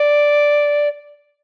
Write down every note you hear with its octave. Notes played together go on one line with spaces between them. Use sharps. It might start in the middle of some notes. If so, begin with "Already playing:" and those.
Already playing: D5